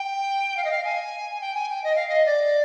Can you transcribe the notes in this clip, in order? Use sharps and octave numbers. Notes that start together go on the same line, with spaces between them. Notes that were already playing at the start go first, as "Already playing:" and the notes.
Already playing: G5
F5
D#5
F5
G#5
G5
G#5
G5
D#5
F5
D#5
D5